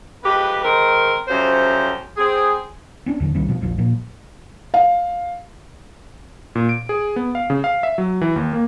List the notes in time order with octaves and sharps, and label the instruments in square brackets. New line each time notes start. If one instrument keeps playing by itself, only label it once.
[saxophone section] F2 G#3 G4 B4
D#3 G#3 C4 A#4
F2 C3 F#3 C#4 C5
C4 G#4
[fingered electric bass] B3 C#4 D4
D#2 D3 F3
C2 D#3 G3 C4
B2 F3
E1 A#1 F3
A#2 F3
[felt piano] F5
[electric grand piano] A#2
D7
G#4
B3
F5
C#3
F5
E5
F#3
E3
D#2
A#3